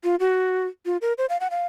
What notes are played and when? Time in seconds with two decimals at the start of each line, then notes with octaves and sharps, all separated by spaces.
0.04 F4
0.20 F#4
0.86 F4
1.02 A#4
1.18 C5
1.29 F5
1.40 F#5
1.51 F5